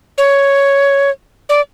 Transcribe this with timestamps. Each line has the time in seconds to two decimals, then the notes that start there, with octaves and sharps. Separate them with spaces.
0.18 C#5
1.49 D5